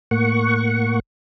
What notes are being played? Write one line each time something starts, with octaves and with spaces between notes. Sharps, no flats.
A2 A#3 F#5 C#6